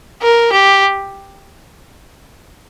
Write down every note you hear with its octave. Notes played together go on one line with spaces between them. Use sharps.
A#4
G4